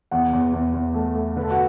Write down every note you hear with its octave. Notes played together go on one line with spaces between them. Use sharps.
E2 F#5
E2
E2
E2
A3
A3
D3 B4
A4
F#4